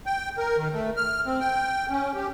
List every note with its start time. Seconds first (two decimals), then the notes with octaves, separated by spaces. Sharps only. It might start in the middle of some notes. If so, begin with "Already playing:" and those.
0.06 G5
0.38 A#4
0.56 D#3
0.73 A3
0.96 F6
1.26 C4
1.40 G5
1.89 C#4
2.15 G4